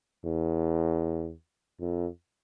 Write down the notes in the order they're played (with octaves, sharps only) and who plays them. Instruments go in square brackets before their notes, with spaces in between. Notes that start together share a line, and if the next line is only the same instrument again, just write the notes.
[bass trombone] E2
F2